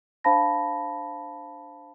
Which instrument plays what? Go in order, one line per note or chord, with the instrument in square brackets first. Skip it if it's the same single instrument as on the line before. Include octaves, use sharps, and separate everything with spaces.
[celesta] D4 C5 F5 A5 B5 A#6